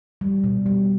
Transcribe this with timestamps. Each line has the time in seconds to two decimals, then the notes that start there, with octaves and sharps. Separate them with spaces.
0.21 G3
0.44 B2
0.66 G3